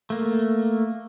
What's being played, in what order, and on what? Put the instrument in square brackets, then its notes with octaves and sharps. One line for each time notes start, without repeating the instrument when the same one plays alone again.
[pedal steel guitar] A3 A#3